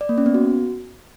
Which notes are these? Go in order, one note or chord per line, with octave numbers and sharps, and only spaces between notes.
D5
A#3
C#4
B3
F#4